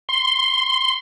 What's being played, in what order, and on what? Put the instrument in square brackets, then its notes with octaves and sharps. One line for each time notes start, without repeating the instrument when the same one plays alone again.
[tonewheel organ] C6